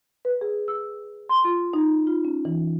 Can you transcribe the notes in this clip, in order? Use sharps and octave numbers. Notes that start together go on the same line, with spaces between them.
B4
G#4
E6
C6
F4
D#4
F4
C#4
E3